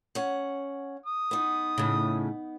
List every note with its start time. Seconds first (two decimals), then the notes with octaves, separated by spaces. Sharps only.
0.15 C#4 F#5
1.06 D#6
1.31 B3 D#4
1.78 A2 C#3